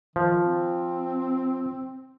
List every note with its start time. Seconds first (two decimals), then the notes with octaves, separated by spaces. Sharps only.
0.16 D#3 F3
0.42 C4